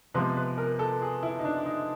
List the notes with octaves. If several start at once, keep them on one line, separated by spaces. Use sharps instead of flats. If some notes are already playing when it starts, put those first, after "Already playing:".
C3 F3 G#3 B3 B4
B4
A#4
A4
G#4
E4
D#4
D4
D#4